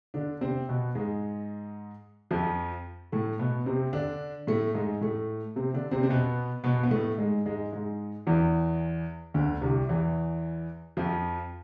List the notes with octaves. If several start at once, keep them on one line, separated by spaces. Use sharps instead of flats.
D3 D4
C3 C4
B2 B3
G#2 G#3
F2 F3
A2 A3
B2 B3
C3 C4
D3 D4
A2 A3
G#2 G#3
A2 A3
C3 C4
D3 D4
C3 C4
C4
B2 B3
B2 B3
B3
A2 A3
G#2 G#3
G#2 G#3
G#2 G#3
E2 E3
D2 D3
C2 C3
E2 E3
F2 F3